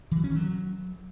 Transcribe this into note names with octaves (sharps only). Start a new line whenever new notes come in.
E3
F#3
C#4
D#3
F#3